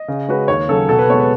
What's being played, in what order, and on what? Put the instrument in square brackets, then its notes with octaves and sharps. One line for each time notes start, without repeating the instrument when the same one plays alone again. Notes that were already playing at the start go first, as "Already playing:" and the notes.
Already playing: [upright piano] D#5
[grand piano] C#3
G#3 C#4 F#4 B4
[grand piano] D#2 [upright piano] C#5
[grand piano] C#3 F#3 [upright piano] A4
[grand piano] B2 [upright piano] A4
[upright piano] B4
[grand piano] G#3 B3 [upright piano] C#5
[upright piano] B4